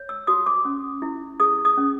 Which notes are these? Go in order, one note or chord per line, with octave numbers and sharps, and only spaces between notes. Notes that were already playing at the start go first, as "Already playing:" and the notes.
Already playing: C#5
E6
F#4 D#6
D6
C#4
E4
G#4 D#6
D#6
C#4